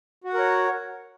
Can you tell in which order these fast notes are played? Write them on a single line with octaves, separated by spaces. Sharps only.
F#4 F#5 A#4 C#5